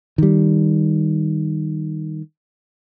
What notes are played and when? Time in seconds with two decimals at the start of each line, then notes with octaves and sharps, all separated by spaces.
0.18 D#3 G3